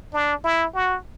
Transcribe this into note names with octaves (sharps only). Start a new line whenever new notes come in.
D4
E4
F#4